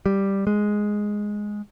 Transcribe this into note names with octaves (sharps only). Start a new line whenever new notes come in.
G3
G#3